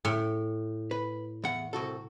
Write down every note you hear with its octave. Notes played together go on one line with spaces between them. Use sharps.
A2
B4
E2 F#5
C2 F#4 A4